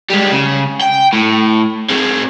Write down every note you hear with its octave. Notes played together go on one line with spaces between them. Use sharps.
G3 G#3
C#3
G5
A2
C4 G#4